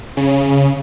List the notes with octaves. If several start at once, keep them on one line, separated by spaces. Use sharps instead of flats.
C#3